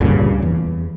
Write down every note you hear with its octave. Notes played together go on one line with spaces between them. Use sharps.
D2 G2 A#2 C#3
E2